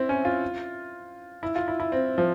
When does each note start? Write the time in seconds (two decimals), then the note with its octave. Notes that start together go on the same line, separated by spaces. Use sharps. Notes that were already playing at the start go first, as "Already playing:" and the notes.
Already playing: C4 E4
0.09 C#4
0.25 F4
1.43 E4
1.56 F4
1.68 E4
1.80 E4
1.92 C4
2.18 F3